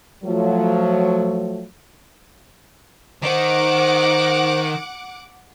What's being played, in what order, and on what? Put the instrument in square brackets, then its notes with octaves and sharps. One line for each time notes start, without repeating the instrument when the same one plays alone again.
[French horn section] F3 F#3 A3
[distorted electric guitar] D#3 [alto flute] C5 [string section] F#5 D6